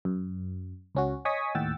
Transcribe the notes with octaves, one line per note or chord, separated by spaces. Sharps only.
F#2
C#2 C#4 F#4
C#5 D#5 G#5 C#6 D#6 B6
D#2 A2 F#5 G5 E6 A6